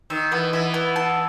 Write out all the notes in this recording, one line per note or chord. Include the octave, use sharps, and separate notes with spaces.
D#3 E5
E3 B3
E3 E5
B3
A5